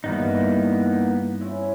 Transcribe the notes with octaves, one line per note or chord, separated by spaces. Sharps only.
G2 E3 A#3 B3 D#4
C4 C#4 E4